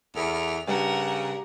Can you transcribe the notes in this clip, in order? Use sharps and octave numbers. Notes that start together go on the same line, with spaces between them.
E2 A4 F6
G2 C#3 G4 A#4 F#5